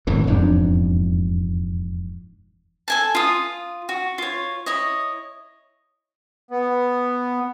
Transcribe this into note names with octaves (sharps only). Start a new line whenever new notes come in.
G#1 F#2 A2 E3
E1 F2 G#2 D4
A4 G#5 A5
F4 D#6
F#4
F4 C#5
E4 C#5 D#5
B3